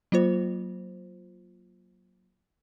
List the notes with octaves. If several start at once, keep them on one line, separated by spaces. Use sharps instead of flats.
F#3 A#3 F4 C5